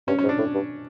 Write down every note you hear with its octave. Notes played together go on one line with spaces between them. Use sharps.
G2 C#4
C#4
G#2
D4
A2
G2